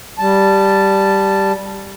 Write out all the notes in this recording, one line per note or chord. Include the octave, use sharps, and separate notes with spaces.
G3 A5